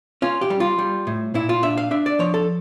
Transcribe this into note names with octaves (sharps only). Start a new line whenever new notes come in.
C#4 F4
G4
G3
F4
G3
A2
A#2 E4
F4
D4 E5
F5
D4 E5
D5
F3 C#5
A4